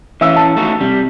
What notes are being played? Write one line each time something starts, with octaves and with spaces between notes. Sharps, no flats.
E3 C#4 E5 F5 E6
A5 E6
A3 D#4 F#4
C3 G3